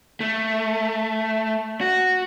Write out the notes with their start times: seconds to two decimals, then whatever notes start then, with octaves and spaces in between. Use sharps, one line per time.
0.20 A3
1.81 F#4